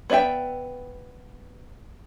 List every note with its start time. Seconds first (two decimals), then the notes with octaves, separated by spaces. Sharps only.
0.10 B3 C#5 D5 E5 G5